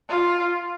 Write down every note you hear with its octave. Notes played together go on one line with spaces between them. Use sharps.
F4